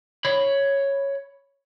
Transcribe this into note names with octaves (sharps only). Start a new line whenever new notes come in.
C#5 B5